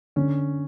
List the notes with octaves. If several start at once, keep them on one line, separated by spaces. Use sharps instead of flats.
D3 C#4